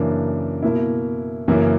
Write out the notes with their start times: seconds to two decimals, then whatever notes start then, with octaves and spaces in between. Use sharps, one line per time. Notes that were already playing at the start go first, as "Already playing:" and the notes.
Already playing: F#2 C#3 E3 A#3 D4
0.62 B2 A#3 E4
1.48 F#2 C#3 E3 A#3 E4